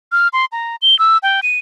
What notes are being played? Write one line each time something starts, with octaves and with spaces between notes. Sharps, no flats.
F6
C6
A#5
G7
E6
G5
D#7